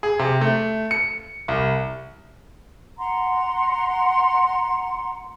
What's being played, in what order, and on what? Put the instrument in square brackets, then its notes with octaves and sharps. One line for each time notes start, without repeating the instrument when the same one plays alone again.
[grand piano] G#4
C3
A3
C#7
C2
[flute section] F#5 A#5 C6